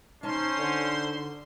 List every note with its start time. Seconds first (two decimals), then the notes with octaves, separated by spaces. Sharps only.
0.23 C#4 D#4 C5 A5 C6
0.58 D3